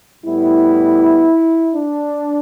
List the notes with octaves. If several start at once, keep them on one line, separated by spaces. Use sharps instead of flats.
A2 G3 B3 E4
D4